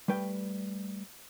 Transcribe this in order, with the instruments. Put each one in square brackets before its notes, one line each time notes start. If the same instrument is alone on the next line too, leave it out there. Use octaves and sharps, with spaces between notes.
[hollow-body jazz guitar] G3 A3 B4 G5